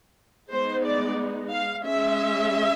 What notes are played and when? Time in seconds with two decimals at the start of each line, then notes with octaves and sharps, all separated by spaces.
0.51 G#3 B3 D#4 C5
0.84 D5
1.51 F5
1.84 G#3 C#4 E5